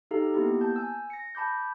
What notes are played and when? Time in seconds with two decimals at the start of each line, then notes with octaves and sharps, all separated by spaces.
0.11 D#4 G4 A4 F5 A#5
0.34 A#3 B3 E4 G4
0.61 A5 G6
0.76 G#5 E6
1.10 A#6 C#7
1.35 A5 B5 D6 G6